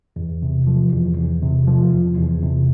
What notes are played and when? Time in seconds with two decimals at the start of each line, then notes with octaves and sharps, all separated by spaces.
0.16 E2
0.42 C3
0.67 F3
0.92 E2
1.17 E2
1.42 C3
1.68 F3
1.92 E2
2.17 E2
2.42 C3